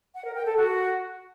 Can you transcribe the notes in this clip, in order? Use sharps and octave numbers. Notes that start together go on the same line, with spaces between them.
F#5
A#4
G5
A4
F#4